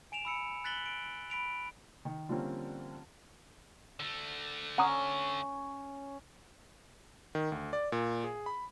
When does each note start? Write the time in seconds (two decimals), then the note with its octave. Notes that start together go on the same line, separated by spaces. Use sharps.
0.12 G#5 D7 E7 F7
0.25 B5 E6 C#7
0.64 F#6 A6 B6 F#7 G7
0.86 D7
1.30 B5 B6 D7 F7
2.05 D#3
2.29 D3 F3 G3 A#3 C4 C#4
4.00 D3 A3
4.78 C#4 F#5 A#5 D#6
7.35 D#3
7.52 D2
7.73 D5
7.92 A#2
8.24 G#4
8.46 B5